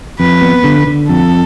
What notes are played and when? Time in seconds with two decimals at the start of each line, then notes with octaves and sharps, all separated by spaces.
0.19 F2 B4
0.42 B3
0.64 D3
0.87 D3
1.09 F2 A4